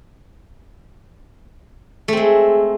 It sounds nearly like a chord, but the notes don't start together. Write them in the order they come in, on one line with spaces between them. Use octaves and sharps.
A3 C4 G#3